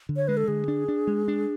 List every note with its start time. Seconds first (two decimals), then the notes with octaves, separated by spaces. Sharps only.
0.09 D3
0.16 C#5
0.28 G#3 B4
0.37 A4
0.48 D3 G#4
0.68 D4
0.88 D4
1.07 G#3
1.28 D4